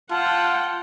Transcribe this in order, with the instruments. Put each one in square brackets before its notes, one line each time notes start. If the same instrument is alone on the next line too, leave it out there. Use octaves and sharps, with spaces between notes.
[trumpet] F4 [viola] F#5 G5 [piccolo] A5